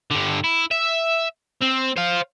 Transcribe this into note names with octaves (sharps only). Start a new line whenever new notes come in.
G2 D3
E4
E5
C4
C5 F5